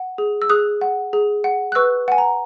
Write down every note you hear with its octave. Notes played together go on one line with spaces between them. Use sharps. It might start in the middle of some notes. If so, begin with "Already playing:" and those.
Already playing: F#5
G#4
E6
G#4 D#6 F#6
F#5
G#4
F#5
F#6
B4 C#6 E6
F#5 G#5
A#5